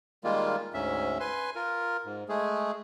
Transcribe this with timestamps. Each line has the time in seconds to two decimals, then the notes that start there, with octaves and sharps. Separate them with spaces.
0.24 D#3 G3 G#3 A#3 F4
0.74 D2 G#2 C#4 E5
1.20 B4 G#5 C6
1.55 F4 A#4
2.05 G#2
2.29 G#3 A3 G#4